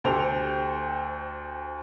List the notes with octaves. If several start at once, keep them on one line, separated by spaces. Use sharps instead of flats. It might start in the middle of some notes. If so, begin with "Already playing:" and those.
D2 G4 A4 C5 G5 F7